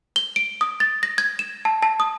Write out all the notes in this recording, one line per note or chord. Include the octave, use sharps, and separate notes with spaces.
G7
D7
D#6
A6
A#6
G#6
E7
A5
A5
D#6